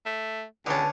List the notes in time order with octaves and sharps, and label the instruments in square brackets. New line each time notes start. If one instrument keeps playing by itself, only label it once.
[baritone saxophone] A3
[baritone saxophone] C#2 [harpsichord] D3 C#4 [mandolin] B3 A5